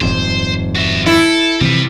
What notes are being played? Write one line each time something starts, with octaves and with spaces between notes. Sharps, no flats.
D#1 F2 G#2 C5
F#4 E5
E4 A4
C3 E3 F3 G3 B4